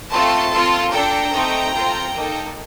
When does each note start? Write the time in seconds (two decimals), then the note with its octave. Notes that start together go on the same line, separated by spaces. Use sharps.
0.11 A3 C4 F4 A4 A5 C6
0.51 C4 F4 A4
0.92 D4 A4 G5 A#5
1.33 A3 C4 D#4 A4
1.73 C4 F4 A4
2.13 A#3 D#4 A4